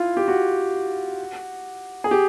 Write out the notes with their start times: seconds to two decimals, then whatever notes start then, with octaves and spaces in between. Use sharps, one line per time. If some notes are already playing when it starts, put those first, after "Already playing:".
Already playing: E4 F4
0.17 G4
0.28 F#4
2.04 G#4
2.11 G4